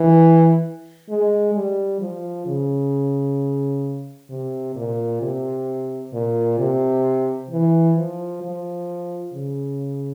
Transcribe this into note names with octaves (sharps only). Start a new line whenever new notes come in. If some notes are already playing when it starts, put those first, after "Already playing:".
Already playing: E3
G#3
G3
F3
C#3
C3
A#2
C3
A#2
C3
E3
F3
F3
C#3